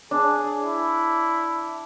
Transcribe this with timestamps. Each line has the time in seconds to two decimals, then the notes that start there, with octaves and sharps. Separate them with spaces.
0.11 D4 G#4
0.61 E4